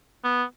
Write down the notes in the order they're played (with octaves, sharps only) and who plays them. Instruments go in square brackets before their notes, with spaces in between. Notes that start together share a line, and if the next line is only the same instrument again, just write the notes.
[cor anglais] B3